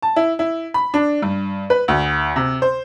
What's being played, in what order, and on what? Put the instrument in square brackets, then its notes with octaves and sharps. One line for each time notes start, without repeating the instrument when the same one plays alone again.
[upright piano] A5
E4
E4
B5
D4
G2
B4
D2
C3
C5